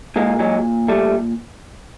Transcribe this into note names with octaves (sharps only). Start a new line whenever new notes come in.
A#2 G#3 A#3
F#3 G#3
G3 A3